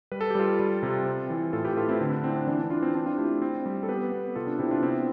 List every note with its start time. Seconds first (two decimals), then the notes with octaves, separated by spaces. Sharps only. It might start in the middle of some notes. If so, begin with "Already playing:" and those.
0.12 G3 B4
0.21 A4
0.31 G4
0.35 G3 F4 A4
0.59 G3
0.83 C3
1.06 C4
1.30 E3
1.53 A2 F4 A4
1.64 G4 B4
1.77 A2 F4 A4
1.89 C4 E4
2.01 D3
2.12 D4
2.24 C4 E4
2.36 D4
2.47 E3 D4
2.60 D4
2.70 E3 D4 F4
2.83 C4
2.94 C4 D4
3.06 D4 F4
3.17 A3 E4 G4
3.42 C4
3.66 G3
3.83 A4
3.88 B3 G4 B4
4.12 B3
4.35 C3 F4 A4
4.47 D4
4.59 C3 C4 E4
4.71 D4 F4
4.82 B3 C4 E4